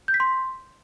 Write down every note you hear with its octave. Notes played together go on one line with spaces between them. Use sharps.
G6
B6
C6